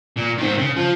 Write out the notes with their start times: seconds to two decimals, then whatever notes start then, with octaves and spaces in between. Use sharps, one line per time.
0.16 A#2
0.38 D#3 C4
0.58 C#3
0.76 F3